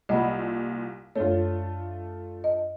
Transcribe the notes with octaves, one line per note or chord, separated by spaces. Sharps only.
C2 A#2 D#5 F#5 B5
F#2 A3 D4 F4 A4 C#5
D#5